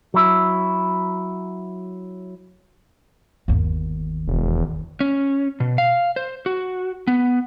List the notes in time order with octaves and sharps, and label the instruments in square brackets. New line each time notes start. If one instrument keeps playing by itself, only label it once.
[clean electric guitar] F#3 E4
[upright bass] G1 D#2
[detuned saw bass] E1
[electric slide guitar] C#4
B2
F5
C5
F#4
B3